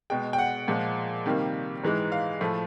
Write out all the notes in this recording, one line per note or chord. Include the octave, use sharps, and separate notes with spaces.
B2 G#3 G5
G5
F#5
A#2 F3 G#3
C3 D#3 G3 A#3
G#2 E3 G#3
F5
A2 F3 A3